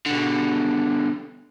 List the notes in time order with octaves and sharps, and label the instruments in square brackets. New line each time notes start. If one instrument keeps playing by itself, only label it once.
[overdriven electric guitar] B2 D3